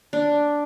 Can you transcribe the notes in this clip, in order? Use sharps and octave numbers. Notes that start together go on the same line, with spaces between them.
D4